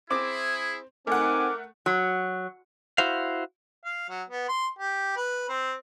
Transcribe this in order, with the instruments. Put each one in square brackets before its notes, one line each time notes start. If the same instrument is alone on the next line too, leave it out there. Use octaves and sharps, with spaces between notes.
[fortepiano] C4 D6 [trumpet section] E4 G#4
[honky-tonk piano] A3 F#5 [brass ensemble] C4 D#4 G#5 [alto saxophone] A#4 [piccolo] D6
[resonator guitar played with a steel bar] F#3
[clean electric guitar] E4 F#4 C5 F5
[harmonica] F5
F#3
B3
C6
G4
B4
C4